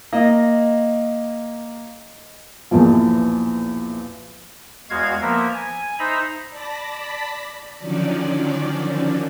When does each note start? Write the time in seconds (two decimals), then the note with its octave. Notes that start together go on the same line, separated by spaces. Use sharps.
0.13 A#3 D#5 A#6
2.71 B1 E2 A#2 E3 F3
4.90 E2 G#3 F#4 F5 G#6
5.22 F3 A#3 B3 A#4 E5
5.54 G#5
5.99 D#4 C5 E5 A#5 B5
6.50 D5 A5 B5 A#6 B6
7.79 D3 D#3 F3 F#3 C#4 D5